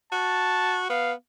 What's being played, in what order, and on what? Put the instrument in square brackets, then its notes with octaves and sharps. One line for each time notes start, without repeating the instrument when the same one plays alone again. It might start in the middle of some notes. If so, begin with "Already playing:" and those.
[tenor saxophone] F#4 [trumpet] A5
[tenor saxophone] B3 [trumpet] F5